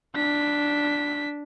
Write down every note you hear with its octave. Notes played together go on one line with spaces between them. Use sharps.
D4 B6